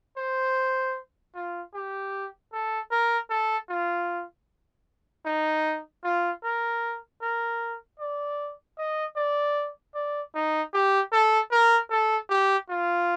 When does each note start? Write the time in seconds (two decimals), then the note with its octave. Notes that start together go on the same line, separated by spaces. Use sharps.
0.17 C5
1.35 F4
1.74 G4
2.53 A4
2.91 A#4
3.30 A4
3.69 F4
5.25 D#4
6.04 F4
6.44 A#4
7.22 A#4
7.99 D5
8.78 D#5
9.16 D5
9.94 D5
10.35 D#4
10.73 G4
11.13 A4
11.52 A#4
11.90 A4
12.30 G4
12.69 F4